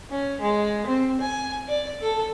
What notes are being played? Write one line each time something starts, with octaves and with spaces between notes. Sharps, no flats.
C#4
G#3
C4
G#5
D5
A4